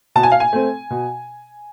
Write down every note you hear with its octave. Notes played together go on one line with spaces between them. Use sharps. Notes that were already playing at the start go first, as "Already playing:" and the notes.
B2 A5
G#5
F5
G#5
A3 C4
B2